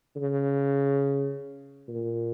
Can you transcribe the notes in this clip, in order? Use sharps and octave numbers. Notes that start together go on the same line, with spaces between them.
C#3
A#2